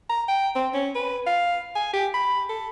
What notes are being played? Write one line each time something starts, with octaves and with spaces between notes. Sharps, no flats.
A#5
G5
C4
C#4
B4
F5
G#5
G4
B5
A4